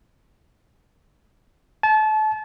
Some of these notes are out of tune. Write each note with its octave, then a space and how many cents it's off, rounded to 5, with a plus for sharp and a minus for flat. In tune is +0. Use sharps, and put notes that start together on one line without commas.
A5 -30